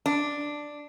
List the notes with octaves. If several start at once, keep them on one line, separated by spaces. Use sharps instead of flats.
D4